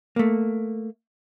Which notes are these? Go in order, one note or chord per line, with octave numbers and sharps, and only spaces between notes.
A3 A#3